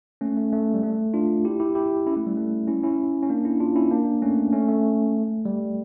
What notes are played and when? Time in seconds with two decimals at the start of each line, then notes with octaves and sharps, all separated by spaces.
0.21 A3 C#4
0.37 A3
0.52 A3
0.74 G3
0.83 A3
1.14 D4 F4
1.45 E4 G4
1.60 E4 G4
1.75 E4 G4
2.06 C#4 E4
2.17 A3
2.27 G3
2.37 A3
2.67 C#4 E4
2.83 C#4 E4
3.22 C#4
3.29 A#3 D4
3.45 C#4 E4
3.60 D4 F4
3.75 C#4 E4
3.91 A#3 D4
4.22 A3 C#4
4.53 A3 C#4
4.68 A3
5.45 G3